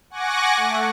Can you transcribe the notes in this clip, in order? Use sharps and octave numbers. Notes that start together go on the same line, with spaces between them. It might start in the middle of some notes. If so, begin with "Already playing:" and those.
F#5 G#5 C#6 D6 F#6 A#6
A3